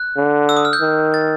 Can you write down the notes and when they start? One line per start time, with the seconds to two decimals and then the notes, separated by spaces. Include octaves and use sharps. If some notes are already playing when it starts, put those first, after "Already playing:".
Already playing: F#6
0.17 D3
0.49 E6
0.57 D#6
0.65 F6
0.73 G6
0.80 D#3
1.14 A6